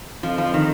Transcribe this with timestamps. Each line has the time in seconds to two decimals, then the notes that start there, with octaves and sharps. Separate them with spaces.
0.23 F2 F3
0.38 F3
0.54 D#3